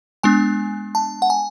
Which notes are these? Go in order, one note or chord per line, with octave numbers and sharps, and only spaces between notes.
G#3 B3 D4 G#5
A5
F#5
G#5